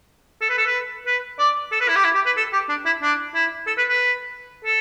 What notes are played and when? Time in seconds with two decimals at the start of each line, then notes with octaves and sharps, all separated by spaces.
0.41 A4
0.50 B4
0.58 A4
0.66 B4
1.06 B4
1.39 D5
1.72 A4
1.80 B4
1.88 E4
1.96 G4
2.04 E4
2.15 G4
2.26 B4
2.37 A4
2.53 G4
2.69 D4
2.86 E4
3.02 D4
3.35 E4
3.67 A4
3.78 B4
3.89 B4
4.65 A4